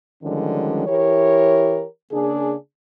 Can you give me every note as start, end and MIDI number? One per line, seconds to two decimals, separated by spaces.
0.23 0.84 50
0.23 0.84 51
0.23 0.84 53
0.23 0.84 55
0.23 0.84 56
0.23 0.84 61
0.87 1.85 52
0.87 1.85 64
0.87 1.85 67
0.87 1.85 70
0.87 1.85 73
2.12 2.54 49
2.12 2.54 58
2.12 2.54 62
2.12 2.54 68